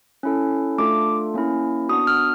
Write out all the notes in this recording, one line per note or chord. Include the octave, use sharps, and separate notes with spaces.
C#4 E4 A4
A3 D4 F4 A4 D6
A#3 C#4 E4
B3 D4 F#4 D#6
F6